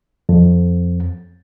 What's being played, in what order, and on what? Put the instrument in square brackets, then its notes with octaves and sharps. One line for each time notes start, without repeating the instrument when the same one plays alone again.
[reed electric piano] F2